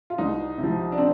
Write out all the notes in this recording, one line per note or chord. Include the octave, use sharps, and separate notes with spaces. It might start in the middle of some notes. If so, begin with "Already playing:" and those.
F4
C2 D#4
C3
F3
D4
C4